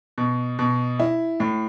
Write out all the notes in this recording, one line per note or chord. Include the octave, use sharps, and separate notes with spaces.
B2
B2
E4
A2